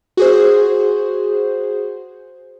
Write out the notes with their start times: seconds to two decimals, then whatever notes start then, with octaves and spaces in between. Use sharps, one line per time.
0.17 F#4 G#4 C5